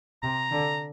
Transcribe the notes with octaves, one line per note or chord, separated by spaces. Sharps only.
C3 A#5
D3